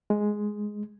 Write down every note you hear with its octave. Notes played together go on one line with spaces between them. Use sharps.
G#3